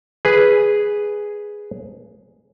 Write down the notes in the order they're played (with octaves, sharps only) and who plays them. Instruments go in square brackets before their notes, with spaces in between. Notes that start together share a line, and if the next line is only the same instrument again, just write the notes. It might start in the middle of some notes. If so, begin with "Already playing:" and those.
[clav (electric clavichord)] G#4 B4